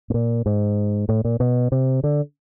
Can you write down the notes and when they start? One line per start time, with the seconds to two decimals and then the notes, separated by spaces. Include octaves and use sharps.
0.10 A2
0.14 A#2
0.46 G#2
1.09 A2
1.24 A#2
1.40 B2
1.72 C3
2.04 D3